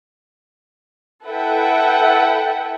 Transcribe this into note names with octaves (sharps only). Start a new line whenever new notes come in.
E4 A4 B4 E5 F#5 G5